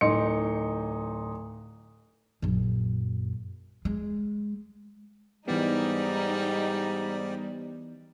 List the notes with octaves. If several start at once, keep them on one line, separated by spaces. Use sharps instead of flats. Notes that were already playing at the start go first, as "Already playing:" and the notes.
D1 D#4 C6 C#7
A#1 F#2
G#3
G#2 E3 G3 B3 D#4 D5